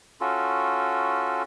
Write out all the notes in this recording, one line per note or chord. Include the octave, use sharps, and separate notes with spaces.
C#4 F4 F#4 A4